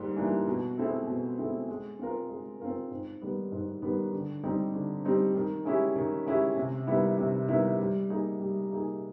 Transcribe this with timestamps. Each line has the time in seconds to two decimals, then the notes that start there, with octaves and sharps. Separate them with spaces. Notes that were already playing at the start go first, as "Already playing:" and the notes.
Already playing: G#2 G3 A#3
0.16 E3 G3 A#3 D4
0.47 B2
0.77 G#3 C4 E4 A4
1.07 B2
1.38 G#3 C4 E4 A4
1.69 G#3
1.99 C4 F4 A#4
2.29 G#3
2.60 C4 F4 A#4
2.91 G#2
3.21 D#3 G3 B3
3.52 G#2
3.82 D#3 G3 B3
4.12 D3
4.44 G3 C4 D#4 G4
4.73 D3
5.04 G3 C4 D#4 G4
5.35 D#3
5.65 G#3 C#4 E4 G4
5.96 D#3
6.26 G#3 C#4 E4 G4
6.56 C3
6.87 D#3 G3 B3 E4
7.18 C3
7.48 D#3 G3 B3 E4
7.79 G3
8.10 A#3 D#4 G#4
8.40 G3
8.70 A#3 D#4 G#4